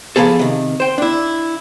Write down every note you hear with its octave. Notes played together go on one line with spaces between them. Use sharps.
F3 A#3 B3 G#4 A4
C3 D#3
C5 G5
D4 E4